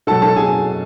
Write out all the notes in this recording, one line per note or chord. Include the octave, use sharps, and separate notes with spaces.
B2 F#3 A3 A4 A5
A4 A5
G#4 G#5